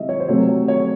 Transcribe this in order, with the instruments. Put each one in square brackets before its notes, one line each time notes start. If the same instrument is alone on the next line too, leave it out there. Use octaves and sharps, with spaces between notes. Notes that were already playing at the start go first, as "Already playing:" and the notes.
Already playing: [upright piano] C3 E3 G#3 D#5 E5
C#5
C5
C3 F#3 A3 C#5
C#5
C#5